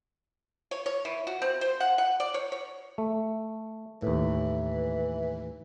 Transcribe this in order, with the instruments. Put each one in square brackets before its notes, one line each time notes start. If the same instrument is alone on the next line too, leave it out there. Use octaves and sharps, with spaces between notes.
[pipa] C#5
C#5
E3
F#4
C4
C5
F#5
F#5
D5
C#5
C#5
[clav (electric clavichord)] A3
[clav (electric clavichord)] D#2 A2 [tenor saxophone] E3